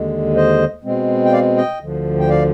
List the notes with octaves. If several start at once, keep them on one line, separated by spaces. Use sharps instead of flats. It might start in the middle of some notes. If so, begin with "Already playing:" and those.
Already playing: D#2 D3 G#3
C5 D#5
B2 G#3 C4
G5
D5 F5
D#5 G5
D2 D3 F3
G5
D5 F5